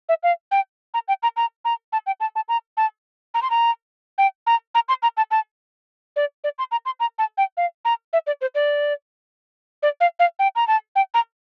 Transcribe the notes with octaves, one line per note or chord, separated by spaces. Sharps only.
E5
F5
G5
A#5
G5
A#5
A#5
A#5
A5
G5
A5
A5
A#5
A5
A#5
C6
A#5
G5
A#5
A#5
C6
A#5
A5
A5
D5
D5
C6
A#5
C6
A#5
A5
G5
F5
A#5
E5
D5
C5
D5
D5
F5
F5
G5
A#5
A5
G5
A#5